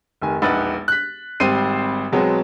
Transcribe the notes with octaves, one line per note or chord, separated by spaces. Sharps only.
F1 D#3 G#5
E1 A#1 D#4 B4 F#5 A6
F#6 B6
G#1 G3 C4 C5 C7 D#7
B2 F#3 G#3 B3 C4